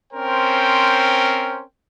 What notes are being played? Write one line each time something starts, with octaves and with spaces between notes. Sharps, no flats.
C4 C#4 A#4 C5 G5